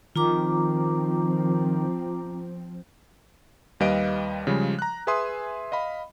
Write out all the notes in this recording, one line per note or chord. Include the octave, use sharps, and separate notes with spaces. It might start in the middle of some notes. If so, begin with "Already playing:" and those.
D#3 F3 C4 F4 A#5 D6
D#2 G3 B4 D#5 F5 D7
C#3 F3 G3 G#3
A#5 F#6
G#4 B4 E5 G#5 C6 D#6
D#5 F5 B5